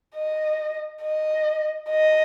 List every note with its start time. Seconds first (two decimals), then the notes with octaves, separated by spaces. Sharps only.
0.15 D#5
1.03 D#5
1.90 D#5